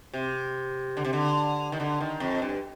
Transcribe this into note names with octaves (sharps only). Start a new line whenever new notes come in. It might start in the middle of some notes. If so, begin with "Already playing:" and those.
C3
D3
C3
D3
D#3
D3
D#3
F2
G2